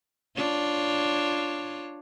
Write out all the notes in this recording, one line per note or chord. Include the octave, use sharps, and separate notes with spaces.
D4 F4 C#5